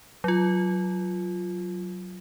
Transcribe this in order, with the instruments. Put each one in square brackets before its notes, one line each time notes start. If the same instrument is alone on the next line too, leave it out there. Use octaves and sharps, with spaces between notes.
[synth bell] F#3 F4